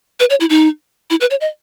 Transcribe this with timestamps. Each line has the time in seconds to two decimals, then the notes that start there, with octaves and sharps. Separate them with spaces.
0.20 B4
0.30 C#5
0.40 E4
0.50 D#4
1.10 E4
1.21 B4
1.31 C#5
1.41 D#5